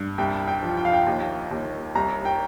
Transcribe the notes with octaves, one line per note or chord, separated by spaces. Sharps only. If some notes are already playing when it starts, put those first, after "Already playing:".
Already playing: G2
C2 G5
G5
F3
G5
F5
G5
D#2
D#2
C2 A#5
G5